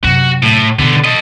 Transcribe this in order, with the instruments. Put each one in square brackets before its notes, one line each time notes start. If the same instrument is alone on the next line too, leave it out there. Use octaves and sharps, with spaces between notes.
[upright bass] F#2 C3 [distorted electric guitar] F#4
[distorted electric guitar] A2
[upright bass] B2 E3 [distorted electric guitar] D3 B3
[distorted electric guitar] A4 D#5